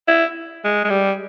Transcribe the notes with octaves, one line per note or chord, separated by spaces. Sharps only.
E4
G#3
G#3
G3